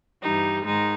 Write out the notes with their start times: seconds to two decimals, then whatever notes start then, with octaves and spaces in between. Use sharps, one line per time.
0.23 G2 E3 G3 D#4
0.65 G#2 D#3 G#3 D#4